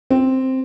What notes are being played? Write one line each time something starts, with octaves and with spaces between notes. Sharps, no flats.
C4